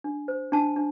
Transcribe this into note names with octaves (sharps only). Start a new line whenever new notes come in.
D4
C5
D4 A5
D4